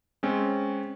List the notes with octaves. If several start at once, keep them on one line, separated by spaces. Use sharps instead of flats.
G#3 C4 C#4